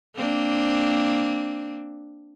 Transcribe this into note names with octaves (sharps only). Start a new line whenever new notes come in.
A#3 C4 D4